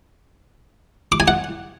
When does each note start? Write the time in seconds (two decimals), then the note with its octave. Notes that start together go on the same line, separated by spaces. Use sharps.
1.12 D6
1.20 G#5
1.28 F#5